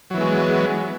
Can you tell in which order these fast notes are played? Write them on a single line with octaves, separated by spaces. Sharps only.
F#3 E3 B3 G#3